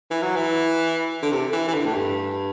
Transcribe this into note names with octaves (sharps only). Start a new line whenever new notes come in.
E3
F#3
E3
D3
C3
E3
E3
D3
A2
G2